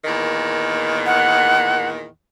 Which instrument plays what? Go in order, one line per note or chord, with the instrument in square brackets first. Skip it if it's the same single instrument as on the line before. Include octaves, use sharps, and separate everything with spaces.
[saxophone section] E2 A#2 D#3
[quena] F#5